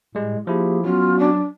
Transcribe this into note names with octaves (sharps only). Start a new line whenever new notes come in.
A2 G3 G#3
F3 A#3 E4 G4 G#4
F#3 B3 C#4 F4 F#4
D4